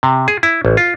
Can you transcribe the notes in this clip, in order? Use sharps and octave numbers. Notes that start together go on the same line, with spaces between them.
C3
G#4
E4
A1
F4